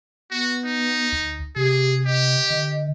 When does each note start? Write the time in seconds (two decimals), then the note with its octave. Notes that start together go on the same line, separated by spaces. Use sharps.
0.31 B3 F#4
0.66 D#4
1.12 D2
1.56 C3 G4 G#4
2.06 G4 D#5
2.50 D3